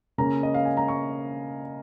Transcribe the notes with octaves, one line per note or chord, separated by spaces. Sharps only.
C#3 A#3 C#4 A#5
D#5
F5
G#5
A#5
C#6